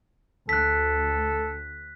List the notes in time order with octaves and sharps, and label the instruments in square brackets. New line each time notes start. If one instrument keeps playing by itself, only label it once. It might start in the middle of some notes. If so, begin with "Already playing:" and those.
[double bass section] D2 [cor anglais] A4 [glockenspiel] F#6 B6